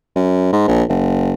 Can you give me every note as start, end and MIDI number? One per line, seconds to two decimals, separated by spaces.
0.16 0.51 42
0.53 0.67 44
0.68 0.83 34
0.89 1.33 30